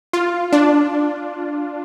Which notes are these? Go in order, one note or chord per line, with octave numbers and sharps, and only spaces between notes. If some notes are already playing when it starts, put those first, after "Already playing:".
F4
D4